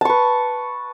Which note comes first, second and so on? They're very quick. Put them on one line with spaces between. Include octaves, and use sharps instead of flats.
A5 C#6 B4